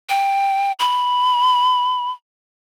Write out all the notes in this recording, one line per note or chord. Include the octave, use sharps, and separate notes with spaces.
G5
B5